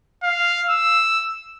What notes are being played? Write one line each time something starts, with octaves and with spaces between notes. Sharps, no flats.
F5
E6